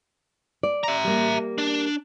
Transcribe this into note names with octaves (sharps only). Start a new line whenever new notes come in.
D5
E5 A#5
G3 A#3
D4